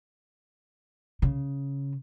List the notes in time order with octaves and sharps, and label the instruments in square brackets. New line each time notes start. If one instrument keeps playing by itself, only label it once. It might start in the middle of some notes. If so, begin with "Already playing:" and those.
[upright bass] C#3